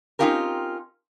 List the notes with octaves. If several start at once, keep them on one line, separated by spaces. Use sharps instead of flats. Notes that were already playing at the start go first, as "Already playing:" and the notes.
C4 C#4 D#4 F4 G4 A#4